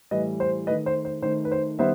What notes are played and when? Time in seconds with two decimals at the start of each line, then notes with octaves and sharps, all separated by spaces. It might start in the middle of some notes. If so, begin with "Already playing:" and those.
0.11 A2 E3 G3 B4 D#5
0.40 C5
0.67 D#3 A3 B4 D#5
0.86 C5
1.05 C5
1.22 D#3 A3 C5
1.45 B4
1.52 C5
1.79 D#3 G3 B3 C5 E5